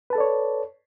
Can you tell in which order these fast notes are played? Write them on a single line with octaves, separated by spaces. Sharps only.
B4 A5 A4 D5 C#5